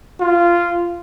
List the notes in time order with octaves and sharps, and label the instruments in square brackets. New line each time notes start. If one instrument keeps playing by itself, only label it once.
[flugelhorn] F4